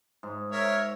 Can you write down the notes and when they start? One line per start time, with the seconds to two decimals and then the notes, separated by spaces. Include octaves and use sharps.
0.23 G#2
0.52 A#4 C#5 E5